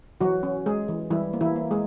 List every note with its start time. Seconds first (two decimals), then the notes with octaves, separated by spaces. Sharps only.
0.21 E3 F#3 F#4
0.43 C#4
0.66 G#3 G#4
0.88 E3
1.11 E3 G3 E4
1.33 A#3
1.41 E3 E4
1.56 A#3
1.71 G#3 G#4